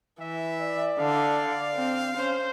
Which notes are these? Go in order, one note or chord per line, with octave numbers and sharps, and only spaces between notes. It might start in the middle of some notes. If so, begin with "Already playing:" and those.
E3 E5
D5
D3 F5
C4
C#4 C5